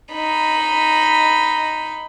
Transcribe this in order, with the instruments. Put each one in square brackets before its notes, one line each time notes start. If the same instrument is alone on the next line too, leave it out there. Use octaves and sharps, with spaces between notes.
[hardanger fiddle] D#4 B5